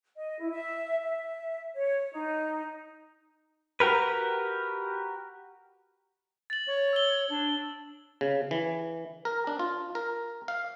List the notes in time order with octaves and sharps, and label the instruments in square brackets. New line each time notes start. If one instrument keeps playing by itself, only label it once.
[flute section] D#5
E4
E5
E5
C#5
D#4
[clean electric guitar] F#4 G4 A#4 B4
[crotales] A6 F#7
[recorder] C#5
[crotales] E6 G7
[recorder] D4
[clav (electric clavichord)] C#3
E3
A#4
D4
F4
A#4
F5